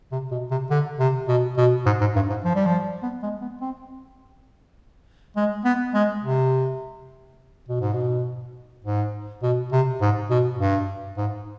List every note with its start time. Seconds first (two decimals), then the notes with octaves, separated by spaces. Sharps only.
0.12 C3
0.31 B2
0.51 C3
0.70 D3
0.99 C3
1.28 B2
1.57 B2
1.86 G#2
2.01 G#2
2.16 G2
2.30 G#2
2.45 F3
2.55 G3
2.66 F3
3.03 B3
3.23 G#3
3.42 B3
3.61 C4
5.36 G#3
5.65 B3
5.94 G#3
6.23 C3
7.68 B2
7.81 G#2
7.93 B2
8.85 G#2
9.43 B2
9.72 C3
10.01 G#2
10.30 B2
10.59 G2
11.17 G#2